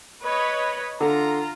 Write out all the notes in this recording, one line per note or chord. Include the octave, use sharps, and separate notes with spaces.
B4 C#5 D#5
D3 F4 A#5